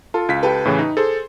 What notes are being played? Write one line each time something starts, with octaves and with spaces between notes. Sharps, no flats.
F4 A4
C#2 F4 B6
G4 A4 B4
A2 C#3 E3
D#4
G#4 A4 C5